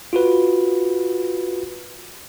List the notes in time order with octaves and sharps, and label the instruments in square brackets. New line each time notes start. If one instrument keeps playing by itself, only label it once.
[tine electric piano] F4 F#4 B4